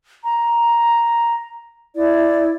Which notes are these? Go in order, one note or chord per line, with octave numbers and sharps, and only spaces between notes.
A#5
E4 D5